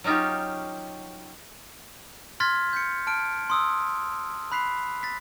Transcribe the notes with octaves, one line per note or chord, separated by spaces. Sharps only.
F#3 C#4 D#4 F4 G4
C6 F6 G#6 A6 B6
G6 B6 C#7
A5 F6 D7
C6 D#6 E6
B5 F#6 B6 C7 F7
A6 B6